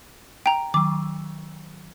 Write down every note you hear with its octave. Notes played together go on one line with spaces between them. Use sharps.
G5 A#5
D#3 F#3 D6